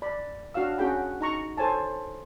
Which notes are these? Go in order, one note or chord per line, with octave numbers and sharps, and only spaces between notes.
D5 B5
D4 F#4 C#5 F5 E6
C#4 F#4 G#4 G5 B5
D#4 A#5 C#6
A4 C5 C#5 G#5 A5